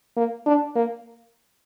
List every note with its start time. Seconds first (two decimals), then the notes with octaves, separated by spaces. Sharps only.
0.17 A#3
0.46 D4
0.76 A#3